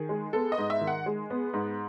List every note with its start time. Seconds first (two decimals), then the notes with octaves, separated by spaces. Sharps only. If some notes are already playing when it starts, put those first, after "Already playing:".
Already playing: D#3 G#4
0.09 G#3
0.33 B3 A4
0.52 D#5
0.58 G#2
0.70 E5
0.81 D#3
0.87 F#5
1.06 G#3
1.30 B3
1.53 G#2